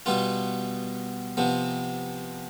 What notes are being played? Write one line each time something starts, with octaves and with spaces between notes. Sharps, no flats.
B2 G3 B3 F4
C3 F3 B3